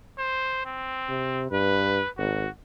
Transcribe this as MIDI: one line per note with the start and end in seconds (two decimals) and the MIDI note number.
0.18 0.63 72
0.65 1.45 60
1.09 1.48 48
1.51 2.00 43
1.51 2.09 71
2.18 2.46 32
2.18 2.50 66